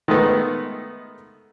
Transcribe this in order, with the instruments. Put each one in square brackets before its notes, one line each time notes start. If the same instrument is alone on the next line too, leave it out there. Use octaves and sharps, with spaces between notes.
[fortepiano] D#3 G#3 A3 B3